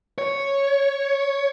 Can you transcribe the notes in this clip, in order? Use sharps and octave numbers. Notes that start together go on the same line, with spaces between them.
C#5